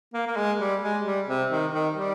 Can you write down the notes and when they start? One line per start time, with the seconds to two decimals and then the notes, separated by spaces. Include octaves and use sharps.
0.13 A#3
0.27 A#3
0.36 G#3
0.59 G3
0.82 G#3
1.05 G3
1.27 C3
1.50 D#3
1.73 D#3
1.95 G3